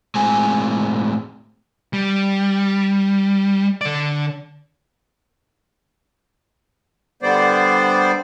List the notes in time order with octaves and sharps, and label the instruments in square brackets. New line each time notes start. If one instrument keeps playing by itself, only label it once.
[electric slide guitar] A2 G#3 C4 G#5
[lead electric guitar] G3
D3 D5
[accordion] D3 G3 B3 C5 D5